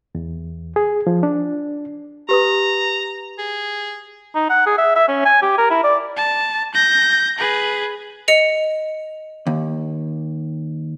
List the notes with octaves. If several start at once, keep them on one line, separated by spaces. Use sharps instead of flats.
E2
G#4
F3
D4
G4 B4 A#5 D#6
G#4
D#4
F#5
G#4
E5
E5
C#4
G#5
G4
A#4
E4
D5
A5
G6 A#6
G#4 B4
D#5 C#7 F7
D#2